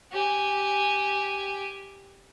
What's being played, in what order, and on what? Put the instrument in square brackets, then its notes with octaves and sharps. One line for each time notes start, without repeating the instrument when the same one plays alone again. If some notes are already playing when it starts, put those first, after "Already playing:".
[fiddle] G4 G#5